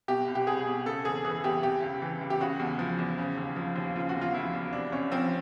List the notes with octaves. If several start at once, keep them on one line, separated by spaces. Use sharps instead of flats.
B2 G4
C2
G4
C2 G#4
B2
C#3 A4
E2 G#4
E3 G#4
E2 G4
C3 G4
C#2
E3
C#2
G4
C#3 F#4
E2
F3
E2
C#3
D#2
F3
D#2
C#3 F4
F#4
E2
F4
F3 E4
E2
C3 D4
C2 C#4
F3 C4